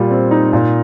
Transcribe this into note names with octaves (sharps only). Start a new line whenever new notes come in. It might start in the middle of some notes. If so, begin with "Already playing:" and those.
Already playing: A#2 G3 F4
C4
D#4
A#2